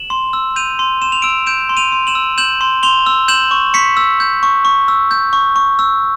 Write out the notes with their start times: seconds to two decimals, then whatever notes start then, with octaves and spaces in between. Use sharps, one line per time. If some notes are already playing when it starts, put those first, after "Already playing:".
Already playing: E7 F#7
0.10 C6
0.33 E6
0.56 G6 D#7 F7
0.79 C6
1.02 C6 E7
1.12 F7
1.22 E6 D7 E7
1.46 G6 D7 E7
1.69 C6
1.77 D#7 F7
1.92 C6
2.07 E7 F#7
2.15 E6
2.38 G6 E7 F#7
2.61 C6
2.83 C6 F7 G7
3.06 E6
3.28 G6 E7 F#7
3.51 C#6
3.74 C#6 B6 C#7
3.97 E6
4.20 G6
4.43 C#6
4.65 C#6
4.88 E6
5.11 G6
5.33 C#6
5.56 C#6
5.79 E6